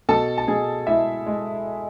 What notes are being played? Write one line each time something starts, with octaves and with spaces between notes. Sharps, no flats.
B2 A4 A5
A5
B2 G#4 G#5
G#3 E4 E5
G#3